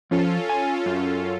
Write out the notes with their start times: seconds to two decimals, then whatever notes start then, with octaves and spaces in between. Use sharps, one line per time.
0.11 F3 C#4 F4 A4
0.49 G#5
0.86 F#2